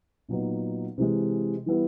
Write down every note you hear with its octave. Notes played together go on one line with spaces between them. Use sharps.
A#2 F#3 B3 D#4
C3 E3 G#3
E3 G3 B3 E4